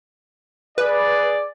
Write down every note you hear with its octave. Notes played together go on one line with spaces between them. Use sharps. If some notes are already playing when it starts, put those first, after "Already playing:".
G#4 B4 D5